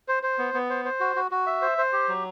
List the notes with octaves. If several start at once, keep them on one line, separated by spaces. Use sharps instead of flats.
C5
C5
B3
B3
C5
C5
F#4
F#4
F#4
E5
C5
C5
G4
F#3